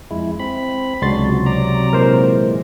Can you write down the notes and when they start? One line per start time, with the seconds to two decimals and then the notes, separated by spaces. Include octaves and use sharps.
0.11 F2 G#3 E4
0.40 C4 B5
1.02 C#2 C3 F#3 G#3 D4 F#4 C6 A6
1.46 D5 A#5
1.93 A#2 E3 G#3 A#4 C5